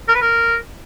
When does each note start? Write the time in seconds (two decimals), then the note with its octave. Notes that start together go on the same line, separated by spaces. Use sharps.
0.08 A#4
0.15 B4
0.21 A#4